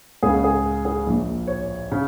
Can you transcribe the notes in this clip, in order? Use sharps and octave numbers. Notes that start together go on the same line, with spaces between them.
C#2 C#3 G#4
G#4
G#4
A#1 A#2
C#5
C#3